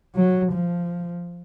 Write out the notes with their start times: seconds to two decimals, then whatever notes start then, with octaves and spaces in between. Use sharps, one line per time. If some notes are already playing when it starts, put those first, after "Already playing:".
0.15 F#3
0.53 F3